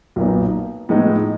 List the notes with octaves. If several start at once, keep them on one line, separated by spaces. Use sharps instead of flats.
B1 A#2 F#3 B3 D#4
A2 F3 G#3 B3 D#4